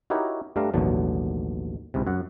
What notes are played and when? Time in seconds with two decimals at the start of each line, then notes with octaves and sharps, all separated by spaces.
0.10 D#4 E4 F#4 G4 A#4 C#5
0.56 G2 G3 A3 D4 F5 A#5
0.74 A1 D#2 B2 D3 F#3
1.94 C#2 G#2 C3
2.07 F#2 F#5